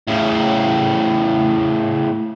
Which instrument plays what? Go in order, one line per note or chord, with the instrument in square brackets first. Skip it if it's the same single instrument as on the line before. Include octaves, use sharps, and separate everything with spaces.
[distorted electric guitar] A2 C#3